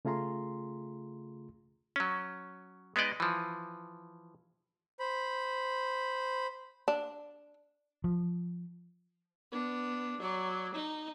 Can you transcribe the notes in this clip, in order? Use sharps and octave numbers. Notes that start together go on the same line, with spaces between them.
C#3 A3 F4 G#4 A#5 C6
F#3 C#4
G#3 B3 D#4 D5 D#5
E3 F3
C5 B5
D4
F3
B3 D4
F#3 D5
D#4